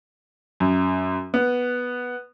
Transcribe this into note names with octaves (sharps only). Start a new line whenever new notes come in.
F#2
B3